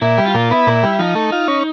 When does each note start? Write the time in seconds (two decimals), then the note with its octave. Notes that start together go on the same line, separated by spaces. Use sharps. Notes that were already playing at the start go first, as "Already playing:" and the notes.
0.01 A#2 E4
0.18 G3
0.26 F4
0.34 A#2
0.51 B3 E4
0.67 A#2
0.83 G3
0.99 F3 D#4
1.15 A3
1.32 F4
1.48 C#4